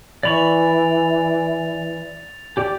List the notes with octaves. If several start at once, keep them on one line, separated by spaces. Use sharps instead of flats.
E3 D5 B5 C#6 A6 F7
G4 D5